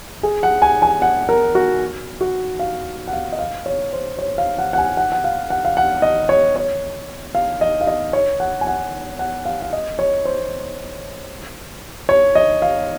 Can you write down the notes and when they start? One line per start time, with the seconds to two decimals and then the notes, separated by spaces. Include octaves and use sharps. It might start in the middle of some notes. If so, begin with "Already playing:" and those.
0.23 G#4
0.43 F#5
0.62 G#5
0.82 G#5
1.02 F#5
1.29 A#4
1.55 F#4
2.21 F#4
2.59 F5
3.08 F#5
3.13 F5
3.33 D#5
3.39 F5
3.66 C#5
3.93 C5
4.19 C#5
4.38 F5
4.58 F#5
4.73 F#5
4.78 G#5
4.97 F#5
5.12 F#5
5.24 F5
5.50 F#5
5.65 F5
5.77 F#5
6.02 D#5
6.29 C#5
6.56 C#5
7.35 F5
7.61 D#5
7.81 F5
7.87 D#5
8.13 C#5
8.40 F#5
8.61 G#5
8.67 F#5
9.19 F#5
9.45 F5
9.62 F5
9.73 D#5
9.99 C#5
10.25 C5
12.09 C#5
12.35 D#5
12.62 F5